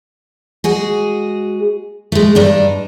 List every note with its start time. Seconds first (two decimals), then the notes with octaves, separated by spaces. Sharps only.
0.64 G#3 F#4 G#4
2.12 G#3 A3
2.35 G2 D4 D#4